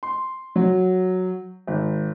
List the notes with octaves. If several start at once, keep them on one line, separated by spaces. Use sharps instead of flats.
C6
F#3
G#1